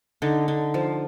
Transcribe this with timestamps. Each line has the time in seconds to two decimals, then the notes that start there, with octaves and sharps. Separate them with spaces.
0.22 D3 D#4
0.48 D3
0.74 F3